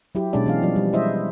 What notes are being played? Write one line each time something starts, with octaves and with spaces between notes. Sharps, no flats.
F#3 E4 G4
B2 G#3 C#4 D4 D5
E3 C#4 F5
F3 G3 D5
G3
G#3 E4 C5 D#5 E5